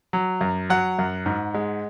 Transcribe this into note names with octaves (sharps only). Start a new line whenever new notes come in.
F#3
F#2
F#3 F#5
F#2
G#2
G#3